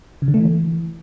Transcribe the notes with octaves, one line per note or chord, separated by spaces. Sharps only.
C#3
D3
A3
E3